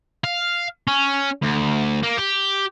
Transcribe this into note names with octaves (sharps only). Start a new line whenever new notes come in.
F5
C#4
D2
A#3
G4